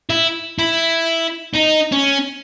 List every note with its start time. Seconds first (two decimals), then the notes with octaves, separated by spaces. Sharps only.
0.10 E4
0.59 E4
1.55 D#4
1.92 C#4